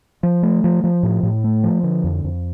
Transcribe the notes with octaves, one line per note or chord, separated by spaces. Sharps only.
F3
A3
F3
F3
A2
A2
A3
F3
D3
F2
F2